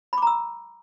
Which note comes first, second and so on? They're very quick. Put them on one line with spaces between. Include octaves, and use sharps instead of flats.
B5 D6 A#5 E6